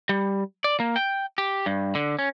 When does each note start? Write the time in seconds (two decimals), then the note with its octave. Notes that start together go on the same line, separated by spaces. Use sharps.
0.09 G3
0.64 D5
0.80 A#3
0.96 G5
1.38 G4
1.66 G2
1.95 D3
2.19 C#4